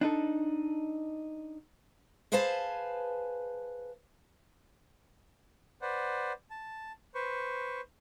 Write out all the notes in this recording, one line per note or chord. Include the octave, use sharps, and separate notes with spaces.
D4 D#4 A4
G#4 B4 C5 F5 G#5 A5
B4 C5 D5 F#5
A5
B4 C5 C#6